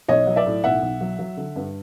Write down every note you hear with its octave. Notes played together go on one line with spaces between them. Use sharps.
B1 C#5 D#5
F#3
D5 E5
A2
B1 E5 F#5
B1
F#3
F#3
D3
G2